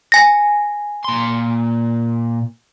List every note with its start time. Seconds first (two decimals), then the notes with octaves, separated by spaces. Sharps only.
0.12 G#5 A#6
1.05 A#2 C6